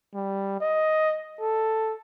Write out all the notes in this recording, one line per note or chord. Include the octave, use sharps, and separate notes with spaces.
G3
D#5
A4